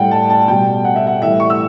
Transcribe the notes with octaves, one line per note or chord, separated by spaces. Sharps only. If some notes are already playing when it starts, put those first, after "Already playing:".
Already playing: A2 G3 F#5 G5
A5
A5
B2 G3 G5
F#5
E5
F#5
A2 E3 G3 E5
C#6
E6